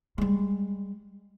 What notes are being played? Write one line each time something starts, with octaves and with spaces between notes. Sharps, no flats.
G3 G#3